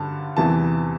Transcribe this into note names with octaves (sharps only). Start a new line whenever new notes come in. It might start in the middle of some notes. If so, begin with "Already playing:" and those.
Already playing: G2 D3 A5
E2 C3 E3 A5